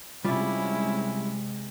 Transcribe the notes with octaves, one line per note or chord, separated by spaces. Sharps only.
C3 G3 G#3 C#4 E4 F4 D5